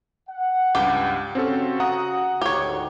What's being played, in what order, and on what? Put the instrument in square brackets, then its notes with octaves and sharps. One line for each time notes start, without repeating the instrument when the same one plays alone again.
[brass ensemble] F#5
[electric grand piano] C#2 G2 [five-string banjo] G4
[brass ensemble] C#3 F#4 [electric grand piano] C4 C#4 A4
[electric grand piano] F#5 A#5 D#6
[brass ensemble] D2 G#2 [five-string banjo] G4 C#5